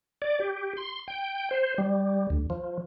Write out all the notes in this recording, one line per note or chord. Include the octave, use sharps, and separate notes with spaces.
D5
G4
C6
G5
C5
G3
D2
F3